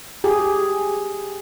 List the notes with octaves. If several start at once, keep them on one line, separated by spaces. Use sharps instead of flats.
G4 G#4